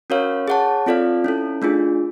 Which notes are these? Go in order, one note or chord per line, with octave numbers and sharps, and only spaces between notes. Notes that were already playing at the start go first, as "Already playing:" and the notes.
C#4 F#4 A#4 C#5 F5
G#4 C#5 F#5 A5
C4 F4 A4 D5 F5
C#4 E4 A4
A3 D4 F4 G#4